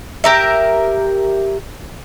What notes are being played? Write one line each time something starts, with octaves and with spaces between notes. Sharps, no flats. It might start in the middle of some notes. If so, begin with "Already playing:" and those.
G4 A#4 E5